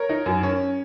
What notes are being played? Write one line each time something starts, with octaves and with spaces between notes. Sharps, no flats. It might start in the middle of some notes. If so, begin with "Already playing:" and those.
Already playing: A#4 C#5
D#4
F#2
C#4